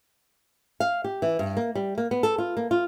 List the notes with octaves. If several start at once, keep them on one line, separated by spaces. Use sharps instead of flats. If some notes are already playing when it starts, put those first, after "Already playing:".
F5
G4
E3
G2
A#3
G3
A#3
B3
A4
F4
A#3
F4